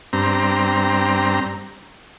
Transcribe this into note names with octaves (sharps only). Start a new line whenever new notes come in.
G2 C4 A#5